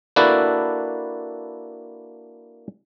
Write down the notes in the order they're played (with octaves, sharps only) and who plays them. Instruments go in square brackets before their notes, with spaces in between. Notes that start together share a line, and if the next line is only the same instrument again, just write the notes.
[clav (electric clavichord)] A#3 D4 E4 F#4 A4 B4